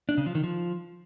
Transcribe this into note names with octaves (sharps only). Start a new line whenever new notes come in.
D4
C#3
F3
D#3
F3